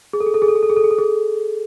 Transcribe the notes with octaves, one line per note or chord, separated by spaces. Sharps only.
G#4
A4
G#4
A4
G#4
A4
G#4
A4
G#4
A4
G#4
A4
G#4